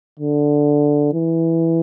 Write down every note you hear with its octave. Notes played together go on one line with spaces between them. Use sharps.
D3
E3